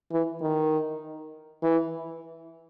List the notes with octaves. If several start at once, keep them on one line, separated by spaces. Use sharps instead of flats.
E3
D#3
E3